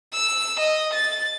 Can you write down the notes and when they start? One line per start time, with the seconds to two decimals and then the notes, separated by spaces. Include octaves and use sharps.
0.13 E6
0.60 D#5
0.94 A6